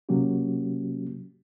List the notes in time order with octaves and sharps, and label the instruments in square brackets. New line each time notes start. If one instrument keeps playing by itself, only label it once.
[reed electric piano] C3 F#3 A#3 C#4 F#4 G4